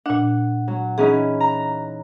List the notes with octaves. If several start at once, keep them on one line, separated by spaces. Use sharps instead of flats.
A#2 D4 F#5
F#3
E3 C#4 D#4 G#4
A#5